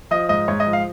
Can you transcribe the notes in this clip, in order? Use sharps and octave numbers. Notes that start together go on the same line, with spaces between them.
F3 D#5
G#2 D#5
G#2 C#5
D#5
F3
F5